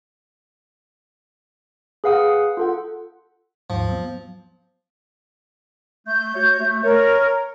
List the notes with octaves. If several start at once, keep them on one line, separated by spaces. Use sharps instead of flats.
G#4 B4 F5 F#5 D#6
F4 A4 F#5
D#2 G#2 F3
F#3 B3
A3 G6
F#4 C#5
A3
A#4 C#5